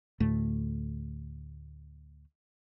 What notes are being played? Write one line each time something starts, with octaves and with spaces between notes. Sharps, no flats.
D2 A2 A3